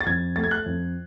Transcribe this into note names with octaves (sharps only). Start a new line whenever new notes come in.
A6
F2 G#6
A3 A6
G#6
F#6
F2